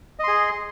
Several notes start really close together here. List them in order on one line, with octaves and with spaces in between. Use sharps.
D#5 C6 G#4